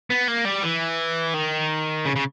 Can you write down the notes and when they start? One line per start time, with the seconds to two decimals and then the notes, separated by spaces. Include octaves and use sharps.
0.10 B3
0.28 A#3
0.45 G3
0.63 E3
1.34 D#3
2.05 C#3
2.16 C#3